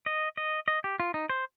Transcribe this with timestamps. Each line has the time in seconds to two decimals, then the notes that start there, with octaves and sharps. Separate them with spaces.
0.06 D#5
0.37 D#5
0.68 D#5
0.84 G4
1.00 F4
1.14 D#4
1.30 C5